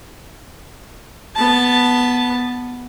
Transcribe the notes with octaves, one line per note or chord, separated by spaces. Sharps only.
B3 A5